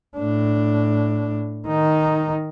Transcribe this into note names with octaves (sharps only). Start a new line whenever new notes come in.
A2 D4
D#3 D#4